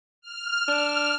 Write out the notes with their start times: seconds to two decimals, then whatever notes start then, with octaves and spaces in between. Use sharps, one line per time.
0.21 F6
0.68 D4